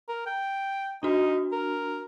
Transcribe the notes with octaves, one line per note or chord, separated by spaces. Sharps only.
A#4
G5
D4 D#4 F#4
A#4